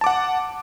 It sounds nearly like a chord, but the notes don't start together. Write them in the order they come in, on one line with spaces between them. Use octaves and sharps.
A5 D6 F#5